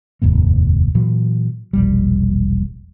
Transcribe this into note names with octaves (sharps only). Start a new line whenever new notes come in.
F1 D#2 G#2 A#3
A#2 E3 F#3
E1 A#1 G3